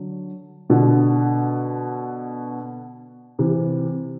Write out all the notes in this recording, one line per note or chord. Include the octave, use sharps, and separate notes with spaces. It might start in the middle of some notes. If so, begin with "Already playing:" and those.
Already playing: D3 F#3
B2 D3
C3 E3